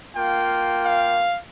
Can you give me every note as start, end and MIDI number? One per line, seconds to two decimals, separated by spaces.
0.16 1.28 58
0.16 1.28 65
0.16 1.28 79
0.86 1.38 77